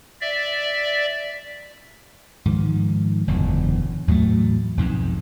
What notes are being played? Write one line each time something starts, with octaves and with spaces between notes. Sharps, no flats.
D5 E5
G#2 D#3 F3
F#1 E2 A#2 D3
E2 A2 F#3 A3
B1 F2 G#2